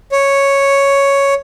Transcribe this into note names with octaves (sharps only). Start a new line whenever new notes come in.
C#5